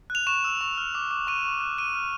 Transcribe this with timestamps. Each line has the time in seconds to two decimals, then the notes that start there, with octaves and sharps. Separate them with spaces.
0.10 F#6
0.15 F7
0.27 C#6 E7
0.44 E6
0.61 C#6
0.77 F6
0.95 D6
1.11 D6
1.27 C#6 D#7
1.44 C#6
1.61 F#6
1.78 F6 D#7
1.95 F6